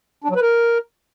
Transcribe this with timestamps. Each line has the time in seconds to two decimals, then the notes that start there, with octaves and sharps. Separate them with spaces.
0.24 D4
0.30 F#3
0.36 B4
0.42 A#4